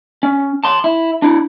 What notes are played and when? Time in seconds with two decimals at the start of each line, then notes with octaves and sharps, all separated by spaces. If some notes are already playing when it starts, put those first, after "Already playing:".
0.23 C#4
0.64 A5 C6
0.84 E4
1.22 D4 E4